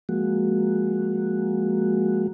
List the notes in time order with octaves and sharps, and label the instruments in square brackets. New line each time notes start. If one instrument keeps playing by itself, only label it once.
[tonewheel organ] F3 G#3 A#3 F#4